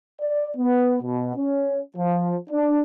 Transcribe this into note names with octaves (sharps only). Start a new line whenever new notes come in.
D5
B3
B2
C#4
F3
D4